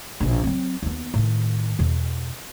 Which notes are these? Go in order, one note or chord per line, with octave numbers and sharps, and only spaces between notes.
A#1 B2
F#3 C4
D#2 B3
A2 D#3
E2 B2